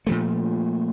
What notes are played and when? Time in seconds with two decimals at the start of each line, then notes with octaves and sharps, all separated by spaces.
0.07 A#2 F3 A3